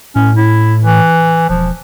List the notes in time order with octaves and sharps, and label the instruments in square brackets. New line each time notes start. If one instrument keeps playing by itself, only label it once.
[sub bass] A2 [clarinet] C#4
[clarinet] E4
E3
[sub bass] E1 [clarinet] F3